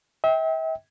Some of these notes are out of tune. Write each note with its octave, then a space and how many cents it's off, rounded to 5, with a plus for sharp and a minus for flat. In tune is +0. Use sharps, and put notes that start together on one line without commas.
E5 -40 G5 +0